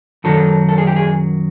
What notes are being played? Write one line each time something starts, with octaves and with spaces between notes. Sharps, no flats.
F#2 D#3 F#3 A4
A4
G#4
G4
G#4